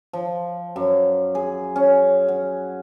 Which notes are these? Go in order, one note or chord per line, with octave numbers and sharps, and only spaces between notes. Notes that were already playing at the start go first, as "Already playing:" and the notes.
F3
F#2
G#4
C#4
F#5